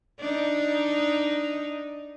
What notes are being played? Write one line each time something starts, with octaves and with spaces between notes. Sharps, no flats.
D4 D#4